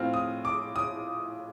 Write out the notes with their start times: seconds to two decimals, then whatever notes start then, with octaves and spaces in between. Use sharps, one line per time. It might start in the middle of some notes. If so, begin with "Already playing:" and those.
Already playing: A2 F3 C4 F4 F6
0.14 D#6
0.45 D6
0.76 D#6